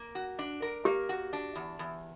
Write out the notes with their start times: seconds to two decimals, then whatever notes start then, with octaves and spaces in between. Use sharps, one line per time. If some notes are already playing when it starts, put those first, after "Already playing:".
Already playing: A#3
0.15 F#4
0.39 D4
0.62 A#4
0.85 A#3 G4
1.09 F#4
1.33 D4
1.56 E2
1.79 E2